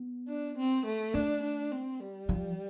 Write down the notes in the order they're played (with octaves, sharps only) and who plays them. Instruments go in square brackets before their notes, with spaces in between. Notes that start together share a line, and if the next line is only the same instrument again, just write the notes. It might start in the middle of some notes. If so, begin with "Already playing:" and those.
Already playing: [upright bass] B3
[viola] D4
C4
A3
[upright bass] A3 [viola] D4
[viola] D4
C4
G3
[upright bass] F3